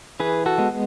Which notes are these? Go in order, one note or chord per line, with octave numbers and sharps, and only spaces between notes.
E3 G#4 B4
F#4 A4
G#3 B3